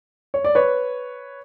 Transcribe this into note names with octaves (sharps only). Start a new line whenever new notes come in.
C#5
D5
B4 C#5